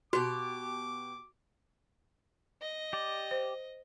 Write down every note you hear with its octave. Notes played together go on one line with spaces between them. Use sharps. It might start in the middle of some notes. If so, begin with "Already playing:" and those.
B2 F#4 G4 D6
D#5
G4 D5
C5